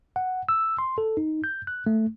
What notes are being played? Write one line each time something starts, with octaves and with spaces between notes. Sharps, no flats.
F#5
E6
C6
A4
D#4
G6
F#6
A3